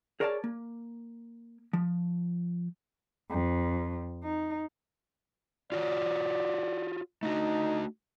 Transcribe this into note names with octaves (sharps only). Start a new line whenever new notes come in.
G#4 A#4 C#5 D5 F5 A5
A#3
F3
F2
D#4
F4 F#4 C#5 D5
A3 D4 D#4 F#4